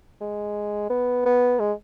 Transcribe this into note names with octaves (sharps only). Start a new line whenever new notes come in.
G#3
B3
B3
G#3